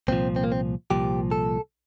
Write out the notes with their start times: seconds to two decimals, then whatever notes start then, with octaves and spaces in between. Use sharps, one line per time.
0.08 C2 A#2 F3 C4
0.36 C4
0.44 A#3
0.52 C4
0.90 C2 A#2 F3 G4
1.31 A4